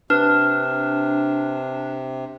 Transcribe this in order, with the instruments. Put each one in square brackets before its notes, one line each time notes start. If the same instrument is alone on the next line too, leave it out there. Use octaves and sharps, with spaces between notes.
[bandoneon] C3 [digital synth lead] D4 [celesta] B4 F6